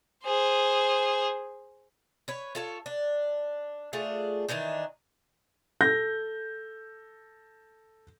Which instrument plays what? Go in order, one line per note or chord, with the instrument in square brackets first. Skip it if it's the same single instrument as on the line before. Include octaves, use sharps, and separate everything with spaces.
[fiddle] G#4 C5
[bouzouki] B4 C#5
F4 A4 C#5
D4
A3 D4 F4 G#4
D#3 E3 D4 D#4
[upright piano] A4 G6 A#6